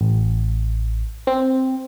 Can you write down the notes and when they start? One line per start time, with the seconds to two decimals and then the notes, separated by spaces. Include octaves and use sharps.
0.01 A1
1.27 C4